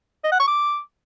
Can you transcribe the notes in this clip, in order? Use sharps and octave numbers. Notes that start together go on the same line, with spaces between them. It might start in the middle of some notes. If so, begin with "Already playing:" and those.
D#5
F#5
C#6
D6